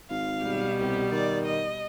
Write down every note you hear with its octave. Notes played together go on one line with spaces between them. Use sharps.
G#1 F5
B2 G3
C2 G4
D#3 D5
D#5